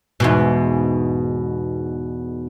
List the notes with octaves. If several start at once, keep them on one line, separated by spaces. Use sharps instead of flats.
E2 G#2 B2